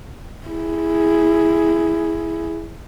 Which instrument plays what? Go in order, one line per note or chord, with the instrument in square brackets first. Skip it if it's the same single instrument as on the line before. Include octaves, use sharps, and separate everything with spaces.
[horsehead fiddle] E4 G#4